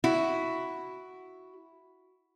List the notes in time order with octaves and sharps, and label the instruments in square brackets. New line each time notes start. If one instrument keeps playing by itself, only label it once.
[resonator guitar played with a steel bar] E4 F#4